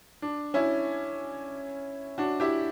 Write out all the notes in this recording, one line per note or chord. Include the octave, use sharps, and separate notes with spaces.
D4
C#4 E4
D4 F#4
E4 G4